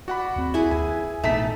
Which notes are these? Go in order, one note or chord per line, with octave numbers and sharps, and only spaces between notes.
F#4 D5 F#5 B5
D#2 C4
E4 G#4 B4
D#2 G#5
A1 B2 A3 B3 D#4 A5 B6